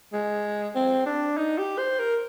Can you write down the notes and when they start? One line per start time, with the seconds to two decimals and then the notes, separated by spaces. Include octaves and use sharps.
0.13 G#3
0.75 C4
1.06 D4
1.37 D#4
1.58 G4
1.78 C5
1.99 A#4